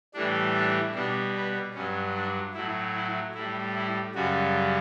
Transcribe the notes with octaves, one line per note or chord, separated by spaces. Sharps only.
A2 E3 G3 D4
D4
B2 G3 D4
B3
G2 F#3 C#4
D4
A2 F#3 E4
E4
A2 G3 E4
E4
F#2 C#3 G3 F#4